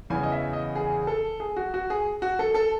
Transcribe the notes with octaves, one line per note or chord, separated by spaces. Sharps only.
E2 C#3 E3 G#5
D#5
E5
D#5
G#4
A4
G#4
F#4
F#4
G#4
F#4
A4
A4